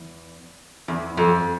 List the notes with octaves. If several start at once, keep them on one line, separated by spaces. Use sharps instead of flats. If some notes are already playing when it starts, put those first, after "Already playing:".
Already playing: E2
E2
F2